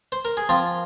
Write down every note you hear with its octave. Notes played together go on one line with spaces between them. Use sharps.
C5
A#4
G#4
F3 C4 F4